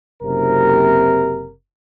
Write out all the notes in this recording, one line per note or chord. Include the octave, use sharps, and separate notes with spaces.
F#1 C3 A#4